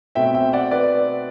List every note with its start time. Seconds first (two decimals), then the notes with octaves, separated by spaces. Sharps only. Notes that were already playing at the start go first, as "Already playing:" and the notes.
0.15 B2 A3 C4 E5 G5
0.34 E5 G5
0.53 D5 F#5
0.71 B4 D5